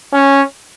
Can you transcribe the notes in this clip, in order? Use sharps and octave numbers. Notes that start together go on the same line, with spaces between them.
C#4